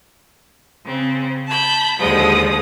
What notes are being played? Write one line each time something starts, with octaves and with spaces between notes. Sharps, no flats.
C#3 C4
A5 B5 G6
D#2 D3 F3 G#3 D#6